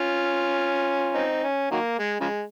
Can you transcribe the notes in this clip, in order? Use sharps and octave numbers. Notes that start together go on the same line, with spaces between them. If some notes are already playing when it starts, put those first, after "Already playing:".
Already playing: C#4 F4
C4 D#4
C#4
D#3 F#3 A#3
G#3
C#3 F3 G#3